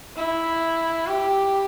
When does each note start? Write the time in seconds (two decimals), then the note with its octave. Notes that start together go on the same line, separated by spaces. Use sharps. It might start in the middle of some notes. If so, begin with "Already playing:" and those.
0.16 E4
1.07 G4